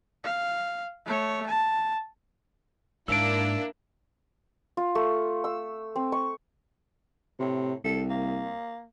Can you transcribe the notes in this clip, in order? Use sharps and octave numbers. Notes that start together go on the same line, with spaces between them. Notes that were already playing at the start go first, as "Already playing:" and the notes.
F5
A3 C#5
A5
G#2 A#3 D4 E4 E6 D7
F4
A3
E6
C4
C#6
A2 C3
C2 A4
A#3